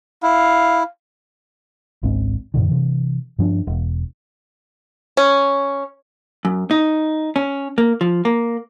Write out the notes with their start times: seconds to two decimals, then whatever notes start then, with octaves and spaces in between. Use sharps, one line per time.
0.23 E4 F5
2.03 G#1 C#2 G#2 C4
2.54 F#2 A#2 D3 D#3
2.68 C3 E3
3.39 G2 F3 D4
3.67 E1
5.17 C#4
6.45 F#2
6.71 D#4
7.36 C#4
7.78 A#3
8.01 F3
8.25 A#3